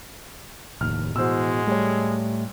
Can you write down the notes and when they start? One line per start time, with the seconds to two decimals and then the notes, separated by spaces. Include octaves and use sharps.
0.81 F1 D#2 A2 F6
1.16 B2 E3 G#3 F#4 C5 E6
1.67 G3 A3 C#5